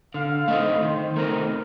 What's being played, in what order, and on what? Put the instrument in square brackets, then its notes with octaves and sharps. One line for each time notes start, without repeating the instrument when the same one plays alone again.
[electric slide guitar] D3 [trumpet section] F5
[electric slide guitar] A3 C4 D#4 [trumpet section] D#5
[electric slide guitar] D#3 [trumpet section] C5
[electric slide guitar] A3 C4 D#4 [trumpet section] A#4